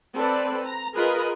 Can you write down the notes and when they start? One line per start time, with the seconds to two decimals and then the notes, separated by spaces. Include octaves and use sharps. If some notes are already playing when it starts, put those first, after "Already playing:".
0.15 C4 A4 B4 D5
0.66 A#5
0.95 F4 G#4 A#4 B4 D#5